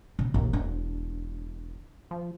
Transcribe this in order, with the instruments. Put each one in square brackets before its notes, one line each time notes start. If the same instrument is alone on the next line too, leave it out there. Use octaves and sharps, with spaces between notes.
[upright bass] B2
[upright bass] A#1 A#2 [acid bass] D#2
[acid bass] E1 [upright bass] D4
[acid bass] F3